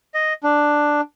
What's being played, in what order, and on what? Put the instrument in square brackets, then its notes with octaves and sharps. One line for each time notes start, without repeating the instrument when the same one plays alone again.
[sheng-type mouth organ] D#5
D4